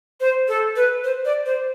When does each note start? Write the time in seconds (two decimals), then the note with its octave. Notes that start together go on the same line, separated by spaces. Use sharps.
0.21 C5
0.48 A4
0.76 B4
1.04 C5
1.25 D5
1.46 C5